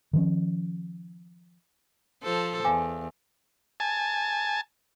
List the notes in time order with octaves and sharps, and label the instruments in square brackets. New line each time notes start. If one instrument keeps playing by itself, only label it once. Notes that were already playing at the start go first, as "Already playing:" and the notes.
[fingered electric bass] D#3 F3 C#4
[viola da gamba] F3 A4 C5
[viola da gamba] E2 [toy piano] F5 G#5 D6
[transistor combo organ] G#5 A5